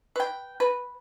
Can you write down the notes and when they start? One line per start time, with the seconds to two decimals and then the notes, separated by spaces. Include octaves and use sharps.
0.16 B4 G5
0.60 B4